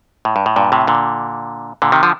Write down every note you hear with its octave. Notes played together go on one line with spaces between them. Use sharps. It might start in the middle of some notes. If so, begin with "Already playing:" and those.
A2
G2
A2
G2 A#2
A2 C3
A#2 D3
A#2 D3
C3 D#3
D3 F3